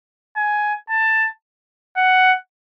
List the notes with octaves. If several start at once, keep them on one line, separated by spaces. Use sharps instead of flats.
G#5
A5
F#5